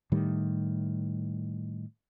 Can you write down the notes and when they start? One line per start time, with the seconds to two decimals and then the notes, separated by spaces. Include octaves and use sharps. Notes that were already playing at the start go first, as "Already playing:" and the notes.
0.12 A2 D#3 G3